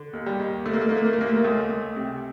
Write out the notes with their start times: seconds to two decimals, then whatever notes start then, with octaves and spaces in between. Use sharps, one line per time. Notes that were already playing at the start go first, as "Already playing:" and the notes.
Already playing: D3
0.13 D#2
0.26 G3
0.39 D#2
0.65 D3 A3
0.73 A#3
0.81 A3
0.89 D3 A#3
0.97 A3
1.05 A#3
1.13 A3
1.17 D#2 A#3
1.29 A3
1.36 A#3
1.44 C#2 A3
1.70 C#2
1.96 C3